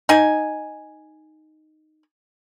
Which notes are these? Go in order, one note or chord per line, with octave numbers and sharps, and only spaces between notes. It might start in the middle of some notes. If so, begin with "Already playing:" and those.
D#4 G#5